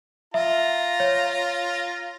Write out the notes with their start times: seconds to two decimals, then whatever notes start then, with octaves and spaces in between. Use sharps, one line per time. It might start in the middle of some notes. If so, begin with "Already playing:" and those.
0.34 F4 E5 A#5
1.00 C#5